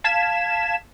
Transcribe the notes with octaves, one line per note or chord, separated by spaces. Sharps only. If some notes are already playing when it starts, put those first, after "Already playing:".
F5 A5 G#6 B6 E7